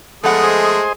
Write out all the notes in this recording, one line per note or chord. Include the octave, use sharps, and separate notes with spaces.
F3 G#3 A3 B3 A4 F#5 D#6
G#4 C5 D#5